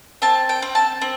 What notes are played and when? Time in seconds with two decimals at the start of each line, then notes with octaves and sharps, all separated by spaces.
0.22 C4 A5
0.49 G5
0.62 C4
0.75 A5
1.01 C4